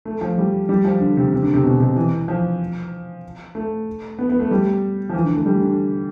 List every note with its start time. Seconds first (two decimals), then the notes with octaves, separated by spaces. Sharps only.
0.05 A3
0.21 F3
0.38 G3
0.69 G3
0.85 F3
1.00 D3
1.17 C3
1.33 C3
1.43 D3
1.54 C3
1.64 B2
1.80 C3
1.96 E3
2.28 F3
3.55 A3
4.19 B3
4.29 B3
4.40 A3
4.51 G3
5.10 F3
5.14 E3
5.24 D3
5.35 A3
5.46 G3
5.62 D3